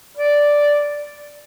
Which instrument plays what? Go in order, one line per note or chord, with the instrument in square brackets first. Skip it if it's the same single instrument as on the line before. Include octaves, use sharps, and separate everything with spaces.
[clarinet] D5